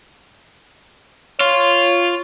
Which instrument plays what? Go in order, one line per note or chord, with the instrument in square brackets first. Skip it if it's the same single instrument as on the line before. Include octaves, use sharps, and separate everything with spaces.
[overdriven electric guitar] F4 [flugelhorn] C#5